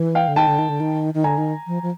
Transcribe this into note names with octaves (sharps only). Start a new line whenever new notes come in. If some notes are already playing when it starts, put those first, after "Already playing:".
Already playing: E3
F5 G5
D3
D#3 G5 A5
D3
D#3
D3
D#3
D#3
D3 G#5 A#5
D#3
F3
F3